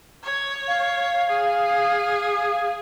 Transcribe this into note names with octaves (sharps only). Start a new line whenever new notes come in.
C#5
F5
G#4